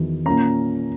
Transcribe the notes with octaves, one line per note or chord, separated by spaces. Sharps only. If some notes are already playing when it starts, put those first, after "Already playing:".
Already playing: E2 D#3 F#3
A#2 A#3 C#4 A#5